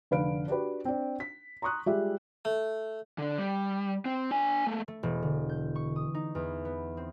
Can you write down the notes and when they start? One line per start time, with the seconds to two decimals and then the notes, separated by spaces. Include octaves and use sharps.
0.11 F1 D3 B4 F5 D7
0.48 D4 F#4 G4 B4
0.85 C4 D4
1.20 B6
1.62 A#5 C6 C#6 D#6 F#6
1.86 G3 G#3 F4 G4 E5
2.45 A3
3.18 D3 D4
3.38 G3
4.05 C4
4.31 D4 G#5
4.66 A3 A#3
4.88 A3
5.03 E1
5.23 D3
5.49 G6
5.75 C#6
5.96 D#6
6.14 D#4
6.35 E2
6.65 B3
6.97 C4